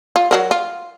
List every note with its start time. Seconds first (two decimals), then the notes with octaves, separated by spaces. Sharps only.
0.16 F4
0.31 F#3 F#4 A#4
0.51 F4